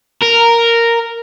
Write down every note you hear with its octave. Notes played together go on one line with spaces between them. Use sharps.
A#4